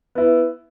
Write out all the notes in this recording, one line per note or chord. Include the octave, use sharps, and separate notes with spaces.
B3 E4